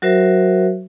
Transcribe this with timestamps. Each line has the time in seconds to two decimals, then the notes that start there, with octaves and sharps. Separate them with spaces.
0.02 F#3 F#4 A#4 C5 E5